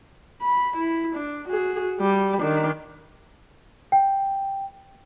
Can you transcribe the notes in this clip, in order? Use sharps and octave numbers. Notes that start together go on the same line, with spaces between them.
B5
E4
D4
F#4 G#4
G3
D#3 D4
G5